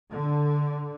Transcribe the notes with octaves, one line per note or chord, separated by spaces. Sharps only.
D3